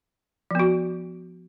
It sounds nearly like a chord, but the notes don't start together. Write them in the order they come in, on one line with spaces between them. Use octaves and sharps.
F3 B3 F#4